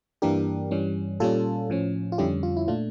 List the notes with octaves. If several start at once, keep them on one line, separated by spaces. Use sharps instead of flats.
G2 E3 A#3 D4 G4 A#4
G2 E3 G3 C#4
A#2 G3 C#4 F4 A4
A2 F3 C#4
F4
F2 D3 G3 C#4 E4 G4
F4
E4
A#2 A3 D4 F4